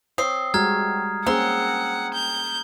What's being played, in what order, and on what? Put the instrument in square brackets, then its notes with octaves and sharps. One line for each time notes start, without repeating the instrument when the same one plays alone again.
[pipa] C4 [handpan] C#5 [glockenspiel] D#6 C7
[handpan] G3 G#3 F#4 [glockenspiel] A#5 F6 G#6
[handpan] A#3 C#4 G#4 [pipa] C4 [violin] F#5 [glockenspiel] A#5
[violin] G6